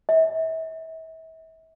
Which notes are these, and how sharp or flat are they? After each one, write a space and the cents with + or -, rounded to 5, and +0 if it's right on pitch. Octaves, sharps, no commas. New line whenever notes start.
E5 -35